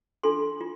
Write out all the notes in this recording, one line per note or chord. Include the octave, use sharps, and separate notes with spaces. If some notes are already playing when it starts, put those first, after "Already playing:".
D4 F4 A4 C6
F4